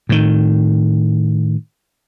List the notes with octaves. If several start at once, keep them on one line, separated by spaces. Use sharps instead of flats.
A2 D#3